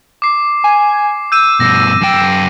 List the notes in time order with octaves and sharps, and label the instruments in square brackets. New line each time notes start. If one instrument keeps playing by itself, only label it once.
[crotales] D6 C7
[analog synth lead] G#5
[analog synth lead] E6 [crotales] G6 D#7
[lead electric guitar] G2 B2 [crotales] A#6
[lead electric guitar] F#2 G5